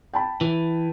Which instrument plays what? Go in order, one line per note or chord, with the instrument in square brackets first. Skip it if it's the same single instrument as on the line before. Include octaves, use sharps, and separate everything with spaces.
[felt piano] G5 A5 B5
[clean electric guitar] E3